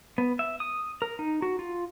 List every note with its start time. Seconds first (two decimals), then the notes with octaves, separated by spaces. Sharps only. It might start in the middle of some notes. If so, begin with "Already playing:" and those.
0.18 B3
0.39 E5
0.60 D#6
1.02 A#4
1.19 D#4
1.42 F#4
1.59 F4